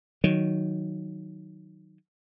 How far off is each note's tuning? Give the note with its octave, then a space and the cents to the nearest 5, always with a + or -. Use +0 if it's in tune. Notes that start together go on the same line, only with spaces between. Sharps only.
D#3 +0 F#3 +0